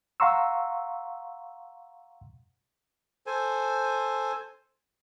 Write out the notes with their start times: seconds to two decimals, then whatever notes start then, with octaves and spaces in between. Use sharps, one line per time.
0.20 F5 F#5 A#5 C6 C#6 E6
3.27 A4 C5 G#5